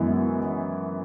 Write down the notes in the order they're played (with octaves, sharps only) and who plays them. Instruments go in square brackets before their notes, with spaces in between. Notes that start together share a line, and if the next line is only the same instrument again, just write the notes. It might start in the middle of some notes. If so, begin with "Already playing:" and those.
Already playing: [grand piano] F#2 E3 G#3 B3 E4